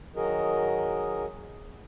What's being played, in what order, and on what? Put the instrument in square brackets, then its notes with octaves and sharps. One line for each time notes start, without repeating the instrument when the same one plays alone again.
[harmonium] D#3 F#3 F#4 G#4 A#4 D#5